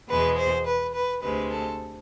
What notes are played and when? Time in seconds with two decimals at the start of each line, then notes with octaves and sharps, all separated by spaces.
0.09 E2 B2 G#3 B4
0.38 C5
0.66 B4
0.94 B4
1.22 D2 C3 G#3 B4
1.50 A4